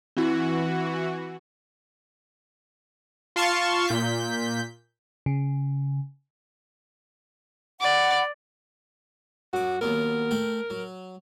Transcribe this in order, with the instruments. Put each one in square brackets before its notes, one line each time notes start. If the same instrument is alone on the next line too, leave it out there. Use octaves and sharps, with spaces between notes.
[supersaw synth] E3 F#4 [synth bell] C4 E4
[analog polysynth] F4 F5 A5 C6 C#6
A#2 G6 B6
[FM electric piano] C#3
[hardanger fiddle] D5 [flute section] F#5 B5
[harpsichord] F#2 D6 [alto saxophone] F#4
[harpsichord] D#2 F#3 B3 [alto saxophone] A#4
[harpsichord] A3 G5
F#3